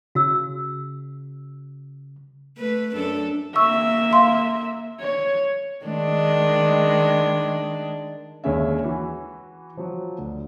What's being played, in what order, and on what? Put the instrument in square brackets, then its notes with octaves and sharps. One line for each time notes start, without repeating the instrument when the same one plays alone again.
[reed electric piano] C#3 [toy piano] F#4 E6
[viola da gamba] A3 B4
F#2 D4 A4
[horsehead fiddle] A#3 E5 [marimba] C#6 E6
[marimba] F5 C6
[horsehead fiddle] C#5
[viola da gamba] D#3 G#3 D4
[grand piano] D#2 D3 G#3 C#4 E5
E3 F#4
F3 F#3
D2